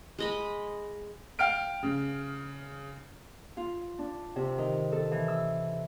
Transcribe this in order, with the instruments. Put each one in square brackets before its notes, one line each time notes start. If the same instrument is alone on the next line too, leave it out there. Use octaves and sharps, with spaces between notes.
[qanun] G#3 D#5 B5
[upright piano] F5 G5 F6 D7
C#3
[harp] F4
D4
C3
D#3
A4
E3
E6